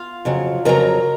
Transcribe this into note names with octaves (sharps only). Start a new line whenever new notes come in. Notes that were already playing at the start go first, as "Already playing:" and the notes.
Already playing: F4 F5
F2 C#3 F#3
F2 C#3 F#3 A#4 A#5